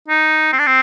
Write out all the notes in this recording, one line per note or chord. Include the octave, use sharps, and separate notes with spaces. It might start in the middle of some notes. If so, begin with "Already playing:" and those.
D#4
C4
D4
C4